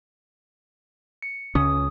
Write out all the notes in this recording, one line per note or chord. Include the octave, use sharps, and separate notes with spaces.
C#7
C#2 C#3 C#4 D#6